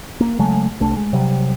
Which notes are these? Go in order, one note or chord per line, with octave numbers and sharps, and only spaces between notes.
A#3
C#3 F#3 G#3 A3
C2 A3 D4
G#3
C3 F#3 G3